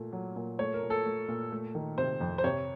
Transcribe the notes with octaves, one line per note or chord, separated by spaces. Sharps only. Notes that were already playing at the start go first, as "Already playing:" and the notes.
Already playing: A#2 A3
F#3
A#2
A3 C#5
A#4
A#2
A4
A3
A#2
A3
D#3
C3 C5
F2
C5
C3 C#5